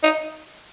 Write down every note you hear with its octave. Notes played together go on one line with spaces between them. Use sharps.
D#4